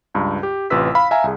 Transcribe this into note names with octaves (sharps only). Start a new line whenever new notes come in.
C#2 G2
G4
A1 C3 F4 B4 E6 B6
F5 B5
E5 F5 G#5 A#5
C2 G#4